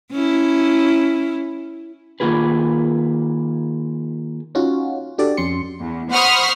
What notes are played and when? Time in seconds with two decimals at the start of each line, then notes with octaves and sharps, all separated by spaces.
0.12 C#4 E4
2.20 D#3 A#3 F4 G#4 B4
4.55 C#4 D#4 F4 F#4
5.18 D4 F#4 G4 A4 D5
5.37 F2 C#4 C6 C#7
5.80 E2
6.11 C5 F#5 B5 C#6 D#6 F6